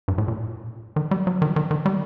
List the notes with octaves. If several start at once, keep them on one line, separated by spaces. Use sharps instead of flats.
G2
A2
A#2
D#3
G3
F#3
D#3
D#3
D#3
G3